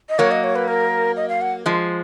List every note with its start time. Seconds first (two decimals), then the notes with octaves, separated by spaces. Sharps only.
0.09 D#5
0.19 F#3 A#3 C#5
0.31 D#5
0.44 C#5
0.55 B4
0.68 A#4
1.16 D#5
1.29 F5
1.41 F#5
1.66 F3 G#3